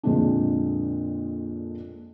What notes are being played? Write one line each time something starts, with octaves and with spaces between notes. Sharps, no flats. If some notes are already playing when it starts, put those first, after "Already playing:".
F2 A#2 D3 G#3 C4 D4